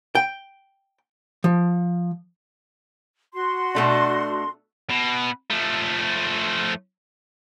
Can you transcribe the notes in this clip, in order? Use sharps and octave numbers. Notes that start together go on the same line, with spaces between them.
G5
F3
F#4 C6
B2 A3 D4
B2
F3 A3